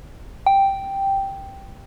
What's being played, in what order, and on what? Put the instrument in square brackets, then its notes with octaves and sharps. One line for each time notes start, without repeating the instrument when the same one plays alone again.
[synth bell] G5